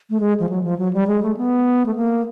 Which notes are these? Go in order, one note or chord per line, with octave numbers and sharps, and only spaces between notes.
A3
G#3
F3
F#3
F3
F#3
G3
G#3
A3
B3
A3
A#3